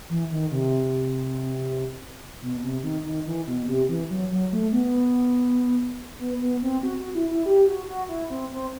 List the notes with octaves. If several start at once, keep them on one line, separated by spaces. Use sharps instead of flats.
E3
D#3
C3
B2
C3
D#3
D#3
E3
B2
C3
E3
F#3
F#3
A3
B3
B3
B3
C4
F#4
F#4
E4
E4
G4
F#4
F#4
E4
C4
C4